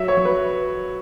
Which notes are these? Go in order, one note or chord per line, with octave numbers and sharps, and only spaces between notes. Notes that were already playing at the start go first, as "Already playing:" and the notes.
Already playing: F#3 E5
C#5
F#3
B4